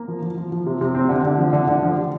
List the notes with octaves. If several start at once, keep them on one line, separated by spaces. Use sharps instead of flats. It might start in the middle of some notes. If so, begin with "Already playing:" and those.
Already playing: A#3
F3
F3
F3
F3
C3
C3
C4
D3
D3
F3
D3
D3
F3
G4